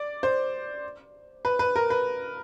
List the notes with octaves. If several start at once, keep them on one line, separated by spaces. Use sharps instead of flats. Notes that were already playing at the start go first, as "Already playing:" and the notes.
Already playing: D5
C5
B4
B4
A#4
B4